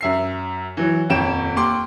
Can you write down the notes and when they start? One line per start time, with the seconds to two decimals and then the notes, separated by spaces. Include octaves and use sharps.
0.01 F#2 E5 C7
0.77 E3 F#3
1.10 D#1 F2 C#5 D7 E7
1.56 D#2 C6 D6